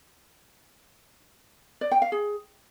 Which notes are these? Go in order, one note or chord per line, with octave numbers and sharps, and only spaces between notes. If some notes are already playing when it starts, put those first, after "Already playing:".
D5
G5
F5
G#4